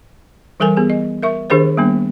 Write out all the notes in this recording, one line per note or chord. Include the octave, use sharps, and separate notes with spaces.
E3 G3 A4 A#4 G#5
B3 G4 G#4
D#5
A#4 E5 C#6
D#3 D4 G4 G#4 A#4 C5
G3 A#3 B3 D4